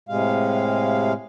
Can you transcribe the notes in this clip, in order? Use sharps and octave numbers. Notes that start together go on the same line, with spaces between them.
A2 C3 G#3 F5